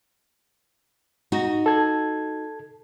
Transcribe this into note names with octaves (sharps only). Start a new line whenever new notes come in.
D#4 F#4
A4 G#6